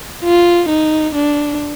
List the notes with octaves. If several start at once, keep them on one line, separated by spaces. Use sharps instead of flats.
F4
D#4
D4